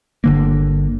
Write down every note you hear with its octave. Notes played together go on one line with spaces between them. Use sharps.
G1 D3 A#3